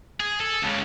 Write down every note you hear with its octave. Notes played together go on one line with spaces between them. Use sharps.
G#4
A4
C#2 C#3